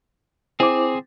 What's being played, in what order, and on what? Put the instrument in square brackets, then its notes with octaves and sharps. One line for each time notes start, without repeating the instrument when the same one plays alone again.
[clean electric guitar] C4 G#4 [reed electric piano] E4 C5 D6